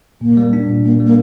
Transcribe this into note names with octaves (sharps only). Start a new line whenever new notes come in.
A#2 A#3
G3
D4
A#2
A#2 A#3
G3
A#3